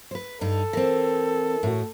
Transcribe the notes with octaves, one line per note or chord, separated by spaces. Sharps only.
B4 C5
G2 D#4 A4
E3 C4 A#4
A2 F#4